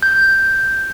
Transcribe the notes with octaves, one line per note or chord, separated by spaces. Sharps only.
G6